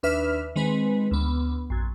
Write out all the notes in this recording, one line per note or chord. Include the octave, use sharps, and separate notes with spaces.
D#2 D4 B4 E5 F6
D#3 G#3 C4 B4
D2 B3
A#1 F#2